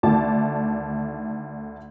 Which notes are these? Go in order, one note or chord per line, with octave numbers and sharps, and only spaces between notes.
D2 D#3 A3 D5 A5